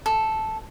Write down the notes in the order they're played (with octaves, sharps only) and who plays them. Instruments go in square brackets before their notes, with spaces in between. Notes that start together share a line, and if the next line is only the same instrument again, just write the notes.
[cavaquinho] A4